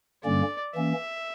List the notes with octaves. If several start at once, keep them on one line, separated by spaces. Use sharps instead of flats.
G2 D3 G3 A#3 C#4 D5
E3 A#3 C#4 E5